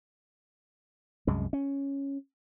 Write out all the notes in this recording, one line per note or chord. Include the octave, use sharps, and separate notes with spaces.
C2 F#2 G#3
C#4